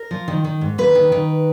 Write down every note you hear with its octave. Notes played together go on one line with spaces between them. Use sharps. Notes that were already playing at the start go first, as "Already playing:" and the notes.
Already playing: A#4
F3
D#3
D#3
G#2
D#2 B4
D#3
D#3